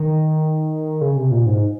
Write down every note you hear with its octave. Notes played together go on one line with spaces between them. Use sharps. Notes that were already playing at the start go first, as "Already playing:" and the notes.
Already playing: D#3
C#3
C3
A#2
G#2